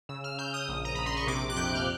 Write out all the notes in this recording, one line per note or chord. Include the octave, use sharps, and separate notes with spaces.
C#3 E6
F6
C#3 G6
D#6
A#1
A#5
A#1 B5
C6
C#6
C3 D6
F#6
F2 G6
F6